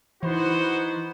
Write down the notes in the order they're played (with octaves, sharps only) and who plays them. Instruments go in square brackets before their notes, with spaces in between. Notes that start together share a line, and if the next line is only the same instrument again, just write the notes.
[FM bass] E3 [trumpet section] B3 F#4 C5 [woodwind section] D#4 E4